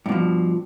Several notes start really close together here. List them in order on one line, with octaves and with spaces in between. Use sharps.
G2 B2 F3